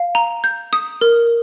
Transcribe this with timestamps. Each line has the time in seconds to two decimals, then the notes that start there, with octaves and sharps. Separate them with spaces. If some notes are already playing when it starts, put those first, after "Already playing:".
Already playing: F5
0.15 A#5
0.44 G6
0.73 D#6
1.01 A#4